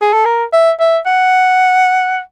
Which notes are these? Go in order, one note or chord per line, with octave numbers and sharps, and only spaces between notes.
G#4
A4
A#4
E5
E5
F#5